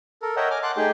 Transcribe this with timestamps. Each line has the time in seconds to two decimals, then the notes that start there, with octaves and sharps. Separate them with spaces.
0.22 A4 A#4
0.36 A#4 C#5 D#5 E5 F#5 G5
0.50 G#5 D6 F6
0.63 F#5 A5 C6 D6 F#6
0.77 A3 D#4 G4 G#4 G5